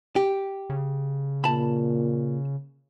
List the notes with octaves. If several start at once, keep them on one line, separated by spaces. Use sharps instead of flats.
G4
C#3
A#2 A5 B5